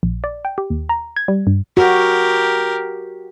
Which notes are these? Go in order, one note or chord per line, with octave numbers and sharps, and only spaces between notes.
A#1
D5
G5
G4
D#2
A#5
G#6
G3
G2
F#4 G4 A#4